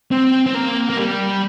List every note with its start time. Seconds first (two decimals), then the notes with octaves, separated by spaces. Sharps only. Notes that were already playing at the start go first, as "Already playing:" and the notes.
0.11 C4
0.46 C4
0.54 A#3
0.90 A#3
0.97 G3